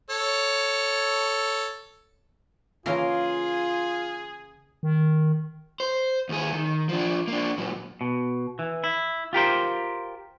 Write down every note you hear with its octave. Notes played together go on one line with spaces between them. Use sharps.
A4 C#5
C#3 E3 A#3 F4 G#4 A#4 C6
D#3
C5
D#2 G#4
D#3
F3 D4
A#3 D4
A#2 F#3
B2
E3
E4
F4 G4 A#4 C5